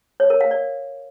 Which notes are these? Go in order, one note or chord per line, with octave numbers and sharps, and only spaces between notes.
C#5
A#4
F5
D5